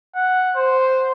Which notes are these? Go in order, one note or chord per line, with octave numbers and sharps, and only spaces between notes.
F#5
C5